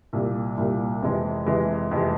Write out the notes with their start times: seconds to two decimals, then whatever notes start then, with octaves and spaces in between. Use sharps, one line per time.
0.13 C2 A#2 G3
0.57 C2 A#2 G3
1.02 F2 C3 E3 G#3
1.46 F2 C3 E3 G#3
1.91 F2 C3 E3 G#3